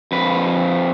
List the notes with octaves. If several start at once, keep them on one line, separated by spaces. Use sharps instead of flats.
F2 B4